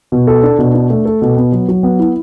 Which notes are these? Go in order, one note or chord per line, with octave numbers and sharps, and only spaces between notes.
B2
A4
D4
B2
D4
A3
A4
B2
B3
F#3
F#3
B3
E4